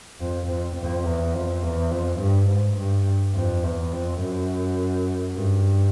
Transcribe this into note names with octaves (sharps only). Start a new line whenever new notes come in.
F2
F2
F2
E2
F2
E2
F2
G2
G#2
G2
F2
E2
F2
F#2
G2